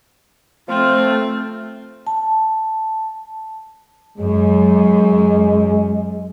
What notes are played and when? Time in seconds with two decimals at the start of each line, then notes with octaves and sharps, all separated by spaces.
0.68 F3 A3 C4 F4
2.07 A5
4.18 F#2 G#3